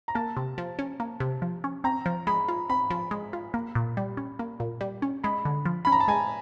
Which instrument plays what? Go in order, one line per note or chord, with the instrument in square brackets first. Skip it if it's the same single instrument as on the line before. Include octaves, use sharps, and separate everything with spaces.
[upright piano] A#5
[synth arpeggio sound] A#3 [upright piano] A5
[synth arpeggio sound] C3
F3
C#4
A#3
C3
F3
C#4
[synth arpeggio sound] C4 [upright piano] A#5
[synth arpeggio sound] F3
[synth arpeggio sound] G#3 [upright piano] B5
[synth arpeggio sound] F4
[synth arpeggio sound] C4 [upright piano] B5
[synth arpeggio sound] F3
G#3
F4
A#3
A#2
G3
C#4
A#3
A#2
G3
C#4
[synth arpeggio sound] G#3 [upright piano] B5
[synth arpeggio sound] D3
F3
[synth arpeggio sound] C#4 [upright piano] B5
[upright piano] A#5
A5
[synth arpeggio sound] G#3 [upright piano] G#5